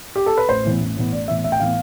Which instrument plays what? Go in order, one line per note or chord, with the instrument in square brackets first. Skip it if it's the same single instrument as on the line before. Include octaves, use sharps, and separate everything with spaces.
[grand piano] G4
A4
B4
A1 C5
A2 E3 B3
A1
A2 E3 B3
A1 D5
A2 E3 B3 E5
A1 E5
G5
A2 E3 B3 F5